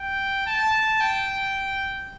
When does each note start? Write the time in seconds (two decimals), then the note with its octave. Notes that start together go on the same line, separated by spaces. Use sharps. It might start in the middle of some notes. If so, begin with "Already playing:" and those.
Already playing: G5
0.47 A5
1.01 G5